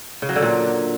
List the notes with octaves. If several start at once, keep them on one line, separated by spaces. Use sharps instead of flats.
C#3
F#3
D3
A#2